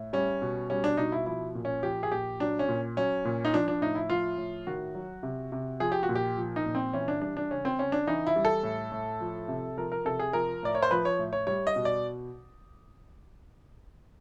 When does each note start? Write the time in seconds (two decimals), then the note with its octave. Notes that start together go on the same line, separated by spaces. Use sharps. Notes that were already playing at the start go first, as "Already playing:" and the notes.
Already playing: A2
0.13 G3 C#4
0.42 B2
0.70 G3 C#4
0.84 D4
0.97 B2 D#4
1.12 E4
1.26 F3 E4
1.55 A#2
1.65 C#4
1.83 F3 G4
2.03 G#4
2.12 A#2 G4
2.40 F#3 D4
2.59 C#4
2.69 A#2
2.97 F#3 C#4
3.25 A#2
3.45 D#4
3.53 F3 D4
3.68 D4
3.81 A2 D#4
3.95 E4
4.10 F3 F4
4.38 A2
4.67 D#3 F#4
4.95 F#3
5.23 C3
5.52 C3
5.80 F3 G#4
5.92 G4
6.03 F#4
6.09 A#2
6.15 G4
6.37 F3
6.56 D#4
6.66 A#2
6.75 C4
6.93 E3 C#4
7.08 D4
7.21 G3 D4
7.37 D4
7.51 C#3 C#4
7.65 C4
7.79 C#3 C#4
7.92 D4
8.07 E3 D#4
8.27 E4
8.36 G3
8.45 A4
8.63 A2
8.92 A2
9.20 F3
9.48 C3
9.77 F3 A#4
9.92 A#4
10.05 C3 A4
10.19 G#4
10.33 F3 A#4
10.63 A2 D5
10.75 C#5
10.83 C5
10.91 F3 B4
11.05 C#5
11.19 A2
11.33 C#5
11.47 G3 C#5
11.67 D#5
11.76 B2
11.85 D5